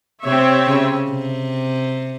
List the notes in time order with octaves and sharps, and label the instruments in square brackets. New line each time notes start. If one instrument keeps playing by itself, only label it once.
[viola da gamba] C3 [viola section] C4 G4 C#5 E5
[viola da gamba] C#3
C3